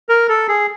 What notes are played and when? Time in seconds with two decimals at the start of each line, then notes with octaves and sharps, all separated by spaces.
0.09 A#4
0.29 A4
0.49 G#4